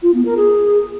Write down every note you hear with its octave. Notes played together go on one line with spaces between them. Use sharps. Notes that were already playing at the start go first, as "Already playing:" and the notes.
F4
B3
A#4
G#4